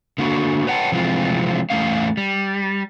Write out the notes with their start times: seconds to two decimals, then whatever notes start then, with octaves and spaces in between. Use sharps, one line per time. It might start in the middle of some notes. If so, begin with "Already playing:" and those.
0.18 D3 A#3 F#4
0.67 B4 C#5 F#5 G5 A5
0.92 C3 E3 F3 G#3 C4 F4
1.70 E2 A2 E3 A3 C#4 F5
2.17 G3